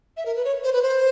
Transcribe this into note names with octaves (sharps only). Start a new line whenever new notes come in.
E5
A#4
B4
C#5
C5
B4
C5